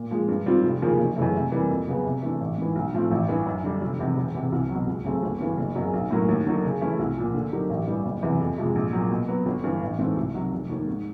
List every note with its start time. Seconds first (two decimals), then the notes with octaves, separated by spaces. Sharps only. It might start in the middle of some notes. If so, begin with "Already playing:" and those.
Already playing: A#2
0.11 F3 G#3
0.28 G2
0.46 D#3 G3 C4 F4
0.64 F1
0.82 D#2 C#3 F3 A#3
0.99 F#1
1.17 F#2 C#3 E3 A3
1.34 C3
1.52 E3 G3 A#3
1.70 F2
1.88 C#3 F#3 B3
2.05 C3
2.22 E3 A3 D4
2.40 A1
2.58 G#2 E3
2.75 B1
2.93 A2 F3 A3 C4
3.11 A1
3.28 G2 E3
3.46 F#2
3.63 D3 G3
3.81 F1
3.99 E2 C3
4.17 E1
4.34 E2 C3
4.52 C2
4.69 B2 F#3
4.87 C#2
5.04 C#3 F#3 A3 C4
5.23 G1
5.40 G2 E3 A3
5.58 F#1
5.75 F#2 C#3 F#3 A#3
5.93 B1
6.11 A2 F#3 A#3 C#4
6.29 D#2
6.46 D3 F#3 A#3 D#4
6.64 C#3
6.81 E3 A3 C#4 E4
6.99 C2
7.17 A#2 F3
7.34 D3
7.52 F#3 A#3 D#4 G4
7.70 A1
7.87 G2 E3 G3
8.05 F#1
8.22 E2 C3 E3
8.40 F2
8.58 C3 F3 G#3
8.75 A#1
8.93 A#2 F#3
9.11 B2
9.28 F#3 B3
9.46 G1
9.64 G2 E3
9.82 A1
9.99 G#2 E3 A3 C4
10.17 C2
10.34 C3 D#3 F#3
10.52 F1
10.69 D#2 D#3
10.87 G#2